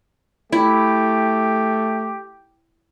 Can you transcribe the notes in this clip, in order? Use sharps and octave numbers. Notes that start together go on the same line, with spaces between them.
A3 E4 G4